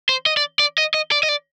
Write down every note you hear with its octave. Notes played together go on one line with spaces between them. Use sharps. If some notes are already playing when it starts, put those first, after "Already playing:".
C5
D#5
D5
D5
D#5
D#5
D5
D#5
D5